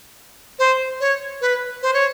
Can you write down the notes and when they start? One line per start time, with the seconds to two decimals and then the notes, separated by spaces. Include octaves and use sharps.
0.59 C5
1.00 C#5
1.41 B4
1.82 C5
1.94 C#5